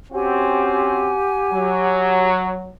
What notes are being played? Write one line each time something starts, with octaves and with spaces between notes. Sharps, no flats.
C4 C#4 F#4 G4 F#5 G#5
F#3